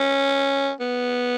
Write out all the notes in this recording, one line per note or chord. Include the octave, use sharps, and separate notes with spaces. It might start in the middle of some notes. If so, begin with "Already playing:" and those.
Already playing: C#4
B3